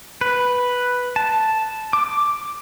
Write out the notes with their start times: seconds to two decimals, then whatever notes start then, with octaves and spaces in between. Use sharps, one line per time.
0.21 B4
1.16 A5
1.93 D6